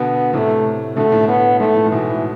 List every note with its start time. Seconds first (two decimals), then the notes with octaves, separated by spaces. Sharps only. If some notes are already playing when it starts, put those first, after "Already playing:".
Already playing: B2 D3 B3
0.33 A2 C3 A3
0.96 B2 D3 A3
1.12 A2
1.28 A2 B3
1.59 G#2 A3
1.75 A2
1.86 A2
1.91 G#2 B2 E3